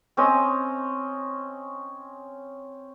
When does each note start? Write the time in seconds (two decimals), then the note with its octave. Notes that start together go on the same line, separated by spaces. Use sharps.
0.17 C4 C#4 D#5 D#6